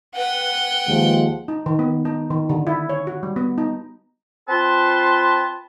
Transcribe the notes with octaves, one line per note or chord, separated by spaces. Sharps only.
B4 F#5 G5
D#2 F3 G#3
D#4
D#3
B3
D#4
D#3
D3
E4
C#5
F#4
G3
B3
D#4
C4 F4 B4 A5 C6